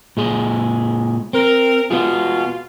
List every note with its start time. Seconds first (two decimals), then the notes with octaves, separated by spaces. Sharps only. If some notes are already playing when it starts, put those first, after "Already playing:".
0.17 A#2 G#3 G#4
1.33 C4 A#4
1.91 B3 F4 F#4 G#4